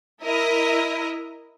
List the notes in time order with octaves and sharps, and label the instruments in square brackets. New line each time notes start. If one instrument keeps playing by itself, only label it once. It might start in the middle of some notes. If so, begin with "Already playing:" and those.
[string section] E4 A#4 D#5